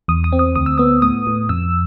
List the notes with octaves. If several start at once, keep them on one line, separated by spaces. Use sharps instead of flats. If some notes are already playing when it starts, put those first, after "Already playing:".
E2 D#6
D#6
C4
D#6
D2 D#6
E6
B3 D#6
A2 D#6
A2
F2 E6